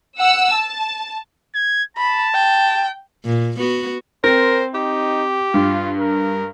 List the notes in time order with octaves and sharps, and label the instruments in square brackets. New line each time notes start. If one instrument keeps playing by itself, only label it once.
[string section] F#5 E6
A5
[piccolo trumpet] G#6
[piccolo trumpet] A5 [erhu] B5
[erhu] G5
[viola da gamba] A#2
B3 F#4
[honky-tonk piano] C4 [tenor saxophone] A#4 [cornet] C5
[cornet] D#4 [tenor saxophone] G4
[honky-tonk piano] G2 [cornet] F4
[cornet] A#4